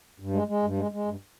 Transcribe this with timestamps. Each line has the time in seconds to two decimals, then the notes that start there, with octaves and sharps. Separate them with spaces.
0.20 G2
0.33 G#3
0.47 G#3
0.62 G2
0.77 G#3
0.91 G#3
1.05 G2